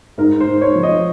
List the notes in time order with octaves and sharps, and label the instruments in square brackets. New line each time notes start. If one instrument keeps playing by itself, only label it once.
[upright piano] G#2 [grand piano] A#4
[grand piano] C5
[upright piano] G#2
[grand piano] C#5
[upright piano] F3
[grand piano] D#5